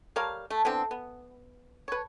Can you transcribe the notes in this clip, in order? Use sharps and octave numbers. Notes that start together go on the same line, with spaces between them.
G3 A#4 C#5 F5
A3
D3 E3 B3 C4
B3
B4 C#5